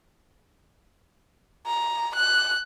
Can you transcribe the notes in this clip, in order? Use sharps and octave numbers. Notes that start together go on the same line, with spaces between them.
A#5
F#6